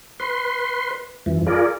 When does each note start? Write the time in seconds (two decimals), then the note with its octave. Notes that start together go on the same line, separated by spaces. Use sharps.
0.20 B4 C6
1.26 F#2 E3
1.47 F4 G#4 A#4 D5